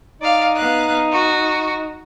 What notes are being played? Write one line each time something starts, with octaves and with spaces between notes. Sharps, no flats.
D#4 D5 F5
B3 F5 F#6
F#4